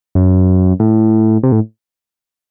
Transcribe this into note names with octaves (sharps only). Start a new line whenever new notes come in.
F#2
A2
C3
A2